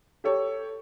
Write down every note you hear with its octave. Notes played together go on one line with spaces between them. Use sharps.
G4 A4 C#5